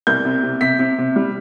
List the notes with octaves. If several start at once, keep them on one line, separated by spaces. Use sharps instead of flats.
C2 G6
C3
C3
C3 B6
C3
C3
G3